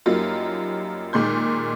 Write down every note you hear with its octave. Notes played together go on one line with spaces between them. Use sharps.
F#2 G3 A#3 D#4 F4
D#2 A#2 G#3 C6 G6